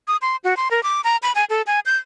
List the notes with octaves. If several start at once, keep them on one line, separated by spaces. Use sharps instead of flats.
D#6
C6
F#4
C6
A#4
D6
A#5
B5
G#5
A4
G#5
G6